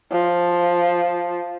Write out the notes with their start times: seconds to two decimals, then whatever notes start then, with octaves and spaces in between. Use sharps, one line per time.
0.12 F3